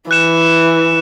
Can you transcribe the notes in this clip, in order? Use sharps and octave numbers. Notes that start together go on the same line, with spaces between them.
E3 F#6 C#7 E7